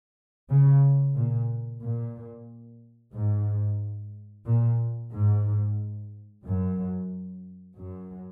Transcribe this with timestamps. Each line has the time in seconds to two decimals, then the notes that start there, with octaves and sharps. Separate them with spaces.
0.49 C#3
1.15 A#2
1.82 A#2
3.14 G#2
4.45 A#2
5.12 G#2
6.43 F#2
7.76 F#2